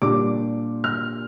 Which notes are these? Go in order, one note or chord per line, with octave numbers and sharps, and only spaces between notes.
A#2 G3 D4 D6
F6